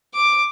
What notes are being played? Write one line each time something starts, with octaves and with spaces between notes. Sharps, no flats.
D6